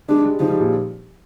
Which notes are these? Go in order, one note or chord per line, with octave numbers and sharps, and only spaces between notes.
G#3 D4
G3
F3 D#4
G3
A#2